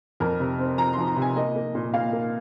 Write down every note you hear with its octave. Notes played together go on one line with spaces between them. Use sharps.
F2 A#4
C3
C4
F3 A#5
F3 C6
A#5
C3
G#5
A#3 D#5
A#3
A#2
A#2 F5
A#3